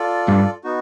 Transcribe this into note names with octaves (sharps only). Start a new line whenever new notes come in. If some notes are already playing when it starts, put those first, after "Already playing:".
Already playing: F4 A4 D5
G2
B3 D#4 F#4